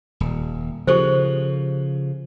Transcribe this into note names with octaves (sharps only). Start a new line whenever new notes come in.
D#1
C#3 F3 G4 A4 C5